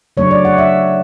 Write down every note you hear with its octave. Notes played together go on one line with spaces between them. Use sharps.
C#3 F#3 A3 D4 C#5
D5
F#5
E5